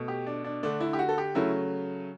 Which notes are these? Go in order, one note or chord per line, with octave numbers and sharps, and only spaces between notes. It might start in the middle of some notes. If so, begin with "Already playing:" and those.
Already playing: B2 A3
G4
D4
D4
D3 A3 D4
E4
G4
F#4
A4
G4
C#3 F#3 A3 E4